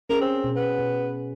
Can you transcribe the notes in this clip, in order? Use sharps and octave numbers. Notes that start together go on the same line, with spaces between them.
C#4 G#4 A#4
C4
B2
B3
B2